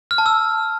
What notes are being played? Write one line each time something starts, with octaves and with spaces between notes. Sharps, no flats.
F6
A5
E6